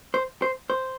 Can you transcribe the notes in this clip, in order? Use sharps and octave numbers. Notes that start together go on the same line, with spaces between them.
C5
C5
C5